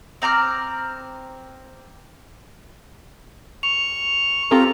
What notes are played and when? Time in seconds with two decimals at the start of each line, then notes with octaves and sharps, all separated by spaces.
0.22 C4 A#5 D6 F6
3.63 C#6 F7
4.51 C4 F4 G4 A4 A#5